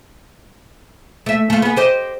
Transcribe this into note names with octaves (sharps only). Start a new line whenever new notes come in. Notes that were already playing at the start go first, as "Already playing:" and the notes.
A3 E5
A3 F4
B3 G#4
G4 C5 D#5